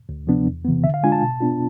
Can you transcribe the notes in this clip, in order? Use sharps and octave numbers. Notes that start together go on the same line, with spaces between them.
D2
C3 F3 B3 D4
E2
C3 E3 B3
D3 E5
F5
G#3 D4 F4 G#5
A5
B2
B3 D4 F4